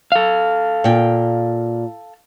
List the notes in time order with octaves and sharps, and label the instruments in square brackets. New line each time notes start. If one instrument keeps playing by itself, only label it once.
[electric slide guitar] A4 F5
[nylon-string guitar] A#2 G5